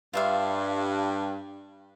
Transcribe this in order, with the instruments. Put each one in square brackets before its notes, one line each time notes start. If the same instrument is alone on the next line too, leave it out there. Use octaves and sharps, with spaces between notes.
[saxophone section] G2 [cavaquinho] F4 E5 F5